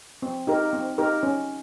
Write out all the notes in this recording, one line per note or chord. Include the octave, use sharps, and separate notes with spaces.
C4
D#4 G4 A#4
C4
D#4 G4 A#4
C#4